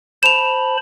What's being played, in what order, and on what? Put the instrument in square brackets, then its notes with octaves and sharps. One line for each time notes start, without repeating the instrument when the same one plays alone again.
[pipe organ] C5 A5 B5 [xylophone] E7 F7